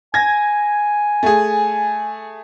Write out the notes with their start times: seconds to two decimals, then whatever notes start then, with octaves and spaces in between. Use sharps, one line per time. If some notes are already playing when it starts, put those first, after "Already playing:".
0.14 G#5 G#6 A#6
1.23 A3 G#4